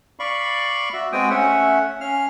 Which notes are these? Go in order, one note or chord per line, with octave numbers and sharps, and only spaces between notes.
D5 F5 B5 C#6
F#4 E5
G#3 B3 C4 F#4 G5 D#6
A3 C#4 E5 F#5
C#4 F5 F6